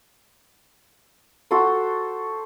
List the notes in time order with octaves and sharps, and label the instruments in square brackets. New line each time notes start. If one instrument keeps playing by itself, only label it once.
[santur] F#4 A4 C5